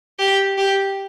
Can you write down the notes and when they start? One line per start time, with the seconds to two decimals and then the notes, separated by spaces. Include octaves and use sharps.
0.19 G4
0.58 G4